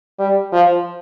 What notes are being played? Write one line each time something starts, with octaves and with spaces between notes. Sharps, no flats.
G3
F3